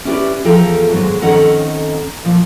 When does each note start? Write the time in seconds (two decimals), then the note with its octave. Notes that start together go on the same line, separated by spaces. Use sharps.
0.05 C#4 E4 G4 A#4 B4 D5
0.44 E2 F3 A4 G5 A#5
0.90 D#2 G#2 F#3 G#3
1.22 F2 D#3 C#4 A4 F#5 A#5
2.24 A#2 F3